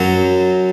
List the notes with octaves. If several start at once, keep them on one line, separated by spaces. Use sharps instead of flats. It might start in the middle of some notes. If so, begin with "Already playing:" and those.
Already playing: F#2 F#3